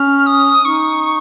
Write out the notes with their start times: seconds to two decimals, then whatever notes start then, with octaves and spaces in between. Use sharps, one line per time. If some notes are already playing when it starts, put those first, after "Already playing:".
Already playing: C#4 F6
0.27 D#6
0.65 D#4 C#6